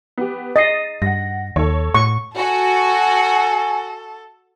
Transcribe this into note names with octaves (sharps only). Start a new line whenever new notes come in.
B3 G4
D#5 A6 C7
G2 F#5 A#6
D#2 A4 C#5
A2 C#6
F#4 A4 G#5